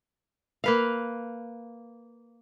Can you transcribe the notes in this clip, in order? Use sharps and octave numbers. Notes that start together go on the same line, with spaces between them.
A#3 B4 F5